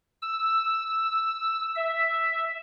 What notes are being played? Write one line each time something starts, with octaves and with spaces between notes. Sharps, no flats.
E6
E5